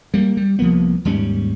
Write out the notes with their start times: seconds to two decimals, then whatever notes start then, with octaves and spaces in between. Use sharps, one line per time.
0.14 G3 A#3
0.37 G3
0.59 C2 F3 A#3 B3
1.05 D#2 G#2 G3 C#4